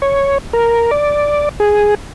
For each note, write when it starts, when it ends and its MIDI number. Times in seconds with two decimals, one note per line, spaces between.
0.02 0.38 73
0.53 0.91 70
0.91 1.49 74
1.60 1.95 68